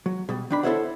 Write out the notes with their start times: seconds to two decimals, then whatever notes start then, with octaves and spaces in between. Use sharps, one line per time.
0.06 F#3
0.29 B2 G3
0.50 D#3 D4 B5
0.63 E4 A4 C5 C#5 E5 F#5